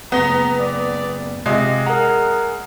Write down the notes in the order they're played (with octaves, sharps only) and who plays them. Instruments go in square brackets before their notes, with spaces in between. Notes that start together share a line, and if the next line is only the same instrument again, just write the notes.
[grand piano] F#1 G7 [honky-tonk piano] B3 A#6 [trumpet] A#5
[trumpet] D5
[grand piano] C3 F4 E5 [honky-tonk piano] G#3 [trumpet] G#4 [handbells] D#5
[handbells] A#4 A#5 [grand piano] F#5